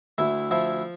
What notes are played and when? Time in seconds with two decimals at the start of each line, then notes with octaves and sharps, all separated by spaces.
0.18 D2 E4
0.51 F3 E4